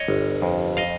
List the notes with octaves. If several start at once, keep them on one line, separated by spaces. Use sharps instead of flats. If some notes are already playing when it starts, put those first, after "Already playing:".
Already playing: C#5 D#5
G1
F2
D#5 F5